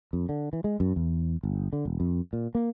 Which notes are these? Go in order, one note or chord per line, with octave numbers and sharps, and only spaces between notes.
F2
D3
E3
G#3
F#2
E2
G1
D3
E1
F2
A#2
A#3